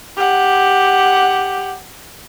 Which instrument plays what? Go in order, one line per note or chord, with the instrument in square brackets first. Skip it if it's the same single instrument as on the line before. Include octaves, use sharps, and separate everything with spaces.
[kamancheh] G4 F#5